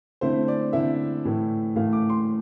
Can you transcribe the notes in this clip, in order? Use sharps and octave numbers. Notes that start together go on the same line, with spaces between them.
D3 A3 C4 E4 C5
D5
D3 A3 C4 E4 E5
A2 E3 A3
A2 E3 A3 F5
D6
C6